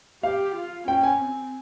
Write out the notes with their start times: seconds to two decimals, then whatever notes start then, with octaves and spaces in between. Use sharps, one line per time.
0.23 G4 F5
0.55 F4
0.87 C#4 G5
1.03 G#5
1.19 C4